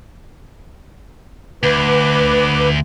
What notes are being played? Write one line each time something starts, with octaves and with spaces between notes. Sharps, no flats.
D2 B4 D6